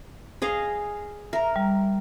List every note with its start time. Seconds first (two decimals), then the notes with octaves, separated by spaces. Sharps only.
0.42 G#4 D#5 F5
1.33 A#4 E5 A#5
1.56 G3